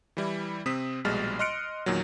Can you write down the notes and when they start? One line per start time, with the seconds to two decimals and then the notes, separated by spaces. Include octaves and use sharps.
0.17 E3 G3 E4
0.66 C3 C4 D#6 B6
1.05 A#1 B2 G3 G#3 F6 A6
1.39 D#5 C6 F6 F#6 C#7 D7
1.86 E2 A#2 D#3 F#3